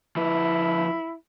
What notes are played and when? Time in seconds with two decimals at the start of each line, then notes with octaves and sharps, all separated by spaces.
0.16 F3 E4 B4